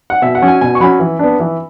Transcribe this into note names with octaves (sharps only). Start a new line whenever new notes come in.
F#5
B2 E5
F#5
F#3 C#4
G#5
B2 G#5
C#6
F#3 C#4 B5
E3
B3 D4
E3